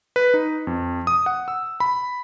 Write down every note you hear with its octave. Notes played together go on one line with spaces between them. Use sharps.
B4
D#4
F2
D#6
F#5
E6
B5